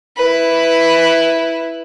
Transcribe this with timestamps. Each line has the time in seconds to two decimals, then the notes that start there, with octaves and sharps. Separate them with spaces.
0.17 E4 B4